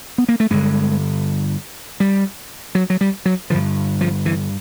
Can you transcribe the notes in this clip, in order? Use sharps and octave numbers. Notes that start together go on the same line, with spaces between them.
B3
A#3
A3
G2 D3 G#3
G3
F#3
F#3
G3
F#3
G2 D3 F3
F3
E3